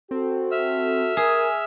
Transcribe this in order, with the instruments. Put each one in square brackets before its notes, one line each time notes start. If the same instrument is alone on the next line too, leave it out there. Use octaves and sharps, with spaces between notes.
[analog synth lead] C4 [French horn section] F#4 A4
[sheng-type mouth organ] E5 E6 F6
[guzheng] G#4 [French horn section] A#4 [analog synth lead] G#5